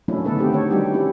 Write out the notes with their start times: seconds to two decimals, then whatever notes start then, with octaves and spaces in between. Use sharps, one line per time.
0.08 F#3 A3 A#3 C#4 D4 E4
0.25 D3 D#3 A3 B3 A4 B4
0.38 A3 B3 C4 G4
0.52 D#3 A#3 A4 C#5
0.71 G3 D4 D#4 F#4 G4
0.93 A#3 C#4 E4 G4